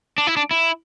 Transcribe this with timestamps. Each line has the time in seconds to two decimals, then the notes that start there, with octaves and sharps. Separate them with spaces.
0.18 D4
0.27 E4
0.37 D4
0.51 E4